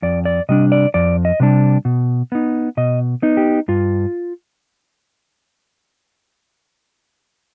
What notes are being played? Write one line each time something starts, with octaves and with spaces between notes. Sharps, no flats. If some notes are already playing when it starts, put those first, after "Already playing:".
F2 D5
D5
C3 G3 D4 D#5
D5
F2 D5
D#5
C3 G3 D4
B2
B3 D#4
B2 D#5
B3 D#4
G4
G2 F4